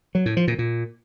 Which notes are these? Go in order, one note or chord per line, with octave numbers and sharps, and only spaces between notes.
F#3
A2
F3
A#2
A#2